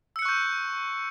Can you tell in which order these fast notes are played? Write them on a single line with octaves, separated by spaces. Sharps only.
E6 C#7 F#6 C#6 G6